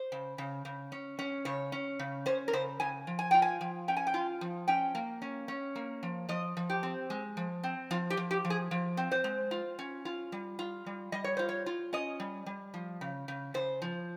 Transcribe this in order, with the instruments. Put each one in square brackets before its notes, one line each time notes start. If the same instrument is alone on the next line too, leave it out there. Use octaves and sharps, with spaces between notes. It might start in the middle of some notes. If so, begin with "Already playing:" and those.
Already playing: [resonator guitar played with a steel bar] C5
C#3
C#3
C#3
C#4
C#4
C#3 C#5
C#4
C#3
C#4 C5
A#4
C#3 C5
C#3 G#5
F3
G#5
F4 G5
G#5
F3
C#4 G5
G#5
G5
F4
F3
C#4 G5
A#3
C#4
C#4
A#3
F3
F3 D#5
F3
G4
C4
G#3
F3
C4
F3 F4
G4
F3
G4
F3
G#4
F3
C4
C5
G#3
F4
C#4
F4
G3
F4
G3
G3 D#5
C#5
F4 C5
C#5
F4
C#4 D#5
G3
G3
F3
C#3
C#3
C#3 C5
F3